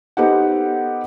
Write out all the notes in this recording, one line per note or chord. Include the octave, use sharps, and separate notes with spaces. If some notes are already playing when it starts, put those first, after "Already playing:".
B3 D#4 G4 A4 C5 F#5